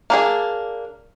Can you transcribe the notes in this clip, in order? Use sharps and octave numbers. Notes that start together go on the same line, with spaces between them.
A#3 D4 G#4